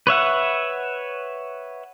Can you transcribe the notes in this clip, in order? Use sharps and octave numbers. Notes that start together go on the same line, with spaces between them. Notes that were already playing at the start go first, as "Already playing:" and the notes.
B4 C#5 E5 F#5